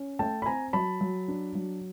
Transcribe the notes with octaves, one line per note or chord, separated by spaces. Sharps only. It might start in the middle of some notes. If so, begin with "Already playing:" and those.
Already playing: C#4
A3 G5 A5
B5
C4 G#5 A#5
F#3 A5 B5
F#3
D4
F#3